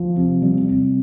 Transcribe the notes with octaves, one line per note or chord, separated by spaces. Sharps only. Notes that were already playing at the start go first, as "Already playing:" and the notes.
Already playing: F3
C3
G3
C3